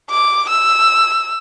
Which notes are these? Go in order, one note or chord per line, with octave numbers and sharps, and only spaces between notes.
D6
E6